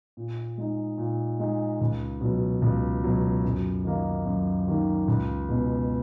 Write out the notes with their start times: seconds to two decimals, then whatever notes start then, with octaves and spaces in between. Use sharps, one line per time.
0.17 A#2
0.58 G#3 D#4
0.98 A#2
1.39 G#3 D#4
1.81 C#2
2.21 B2 F#3
2.62 C#2
3.04 B2 F#3
3.44 F#2
3.84 D#3 A#3 D#4
4.26 F#2
4.67 D#3 A#3 D#4
5.08 C#2
5.49 B2 G#3 B3 F#4